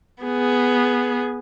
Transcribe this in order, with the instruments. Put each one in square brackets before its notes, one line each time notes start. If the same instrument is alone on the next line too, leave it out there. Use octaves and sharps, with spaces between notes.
[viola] B3 G#4